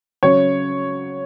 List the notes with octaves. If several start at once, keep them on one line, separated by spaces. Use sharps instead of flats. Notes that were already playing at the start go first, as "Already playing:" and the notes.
C#3 F#3 C#5